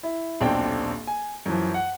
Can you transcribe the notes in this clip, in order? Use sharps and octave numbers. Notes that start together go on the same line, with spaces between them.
E4
D#1 B1 C4 D4 G5
G#5
F#2 E3 F3
F#5